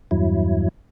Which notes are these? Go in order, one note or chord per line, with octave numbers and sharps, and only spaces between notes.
E2 G2 F#3 E4